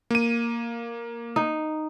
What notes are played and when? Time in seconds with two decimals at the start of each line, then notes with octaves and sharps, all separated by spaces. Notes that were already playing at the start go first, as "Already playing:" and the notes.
0.10 A#3 D#7
1.36 D#4